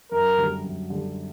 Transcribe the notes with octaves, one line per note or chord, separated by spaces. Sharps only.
F#2 A#4
D3 G3
F#2
D3 G3